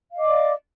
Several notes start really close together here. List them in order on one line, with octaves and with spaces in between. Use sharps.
F5 D#5 D6 D5